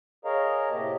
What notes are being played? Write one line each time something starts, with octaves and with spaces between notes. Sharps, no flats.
G#4 A#4 C#5 D#5 F5 A#5
A2 C3 A#3 G4 D#5 A5